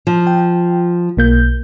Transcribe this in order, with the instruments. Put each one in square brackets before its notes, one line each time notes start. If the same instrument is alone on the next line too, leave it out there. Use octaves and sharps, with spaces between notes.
[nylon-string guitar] F3
[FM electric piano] G5
B1 A#3 G6